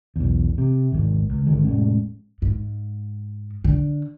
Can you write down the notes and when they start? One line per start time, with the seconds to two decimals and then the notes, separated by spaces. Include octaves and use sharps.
0.16 B1 E2
0.58 C3
0.92 G#1 D#2 G#2
1.29 C#2
1.47 G#1 D3 D#3 G#3
1.64 F1 A2 G#3 C#4
2.42 G#2
3.64 D3